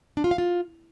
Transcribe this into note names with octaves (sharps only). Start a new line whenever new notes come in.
D4
F4
F5
F4